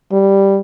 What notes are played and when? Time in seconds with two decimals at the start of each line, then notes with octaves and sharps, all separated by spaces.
0.12 G3